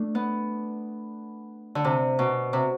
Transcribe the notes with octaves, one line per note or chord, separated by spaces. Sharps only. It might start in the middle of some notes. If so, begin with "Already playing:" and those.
Already playing: A3 D4
B3
D3
C3
B2
C3